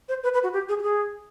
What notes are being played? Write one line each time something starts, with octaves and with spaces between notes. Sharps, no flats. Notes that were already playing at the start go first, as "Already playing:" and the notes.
C5
B4
B4
F#4
G4
G#4
G4
G#4